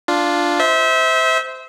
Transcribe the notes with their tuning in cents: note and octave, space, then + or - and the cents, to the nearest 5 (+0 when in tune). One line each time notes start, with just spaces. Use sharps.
D4 +0 F4 +0
C5 -15 E5 -30